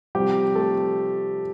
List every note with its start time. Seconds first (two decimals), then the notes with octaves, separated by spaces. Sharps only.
0.15 C3 F3 G3 G4
0.55 A3 A4